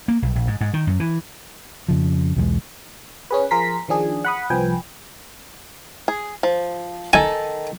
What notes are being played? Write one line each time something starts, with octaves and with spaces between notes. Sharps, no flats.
A#3
B1
A#1
G#2
G#2
D#3
F#2
E3
F2 C#3 F3
B1 E2 F3 G#3
C#4 G#4 B4
F3 G#4 A#4 A#5 C6 B6
D#3 F3 D4 G#4
F#5 B5 D#6
C2 F3 B4 G5 G#5
G#4
F3
D#3 A4 G#5